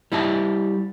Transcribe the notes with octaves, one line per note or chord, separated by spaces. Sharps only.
G3 E4 D#5 A5